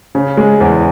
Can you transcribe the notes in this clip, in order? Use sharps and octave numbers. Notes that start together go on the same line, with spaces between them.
C#3
G#3
E2